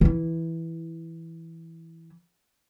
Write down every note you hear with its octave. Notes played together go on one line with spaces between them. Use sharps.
E3 E4